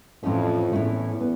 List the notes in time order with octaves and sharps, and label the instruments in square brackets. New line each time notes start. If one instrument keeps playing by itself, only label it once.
[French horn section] F2 [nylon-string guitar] A2 E3 A3 C#4
[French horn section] E2 [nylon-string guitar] A2 E3 A3 C#4
[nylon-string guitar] B3